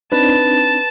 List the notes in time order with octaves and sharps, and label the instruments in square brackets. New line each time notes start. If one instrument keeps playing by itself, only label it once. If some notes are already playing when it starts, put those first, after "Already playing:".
[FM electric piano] C4 D4 D#4 [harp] B4 [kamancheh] A5